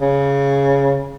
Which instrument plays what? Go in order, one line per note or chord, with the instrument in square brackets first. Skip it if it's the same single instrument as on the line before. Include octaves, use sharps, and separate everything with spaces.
[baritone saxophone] C#3